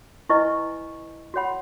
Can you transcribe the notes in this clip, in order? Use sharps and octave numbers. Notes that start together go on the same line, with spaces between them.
E4 B4 D#5 G#5 C#6
F#4 C#5 F#5 B5